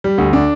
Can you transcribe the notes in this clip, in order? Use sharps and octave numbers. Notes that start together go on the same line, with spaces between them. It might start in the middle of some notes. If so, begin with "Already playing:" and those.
G3
D2
D4